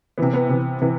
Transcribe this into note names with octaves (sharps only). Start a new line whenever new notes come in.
C3 E3 B3
B3
C3 E3
C3 E3